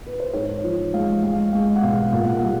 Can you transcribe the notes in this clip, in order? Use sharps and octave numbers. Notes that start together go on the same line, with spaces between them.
B4
C5
G#2 C#5
F3
G#3 F5
G#3 F5
G#3 F5
F#5
B2 F5
A#2 F5
F#5
F5
G3